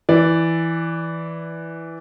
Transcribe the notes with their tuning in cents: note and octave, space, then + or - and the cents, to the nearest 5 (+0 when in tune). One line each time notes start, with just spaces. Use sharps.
E3 +0 D5 +0